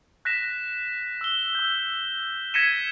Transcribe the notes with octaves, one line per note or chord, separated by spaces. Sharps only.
F#6 A#6 B6 E7
E6 F#6 G7
E6 G6
G#6 A#6 B6 C#7 D#7 E7